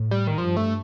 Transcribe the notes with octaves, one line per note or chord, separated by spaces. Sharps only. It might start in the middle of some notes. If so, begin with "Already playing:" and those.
Already playing: A2
G3
D#3
G2 F3
A3